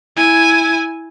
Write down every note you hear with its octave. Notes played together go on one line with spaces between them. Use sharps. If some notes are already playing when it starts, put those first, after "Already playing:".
E4 G#5